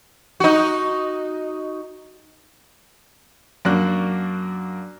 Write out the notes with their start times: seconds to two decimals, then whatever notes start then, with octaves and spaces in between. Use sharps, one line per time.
0.40 D#4 F#4
3.65 F#2 A#3 D4 F#4 F#6